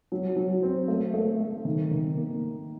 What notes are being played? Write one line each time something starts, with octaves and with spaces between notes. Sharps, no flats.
F#3
F#3
C4
A3
A3
A3
D#3
D#3
A#3